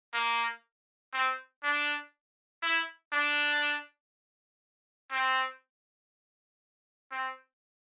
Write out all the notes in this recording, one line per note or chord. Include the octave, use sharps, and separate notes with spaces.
A#3
C4
D4
E4
D4
C4
C4